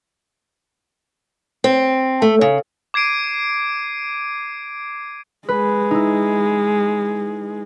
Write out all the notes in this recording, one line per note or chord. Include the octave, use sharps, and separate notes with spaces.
C4
A3
C#3
D6 G#6 C7 D7 D#7
G#3 B4
D#4 E4